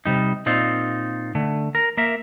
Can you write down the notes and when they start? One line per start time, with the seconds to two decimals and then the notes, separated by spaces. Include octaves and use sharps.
0.05 C3 G3 D#4
0.46 A#2 C4 D#4 F4
1.35 D3 A3
1.75 A#4
1.97 A#3 A#4 E5